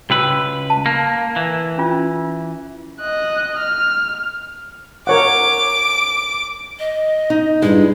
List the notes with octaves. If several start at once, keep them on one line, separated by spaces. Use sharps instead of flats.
C#2 F#4 B4 G5 E6
A5
A#3
E3
C#4 F4
D#5 F#6
F6
A#4 C#5 F#5 D6
D#5
D#4
G2 G#3 E4